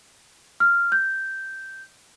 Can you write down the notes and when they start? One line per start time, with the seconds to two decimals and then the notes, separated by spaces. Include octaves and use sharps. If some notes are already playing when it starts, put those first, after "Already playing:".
0.60 F6
0.92 G6